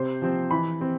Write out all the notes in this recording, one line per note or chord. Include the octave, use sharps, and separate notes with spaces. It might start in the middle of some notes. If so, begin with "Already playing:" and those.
Already playing: C3 C5
F3 C4
E3 B5
C4